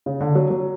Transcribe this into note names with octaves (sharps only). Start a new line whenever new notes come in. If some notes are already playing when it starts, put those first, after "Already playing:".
C#3
D3
F#3
F#3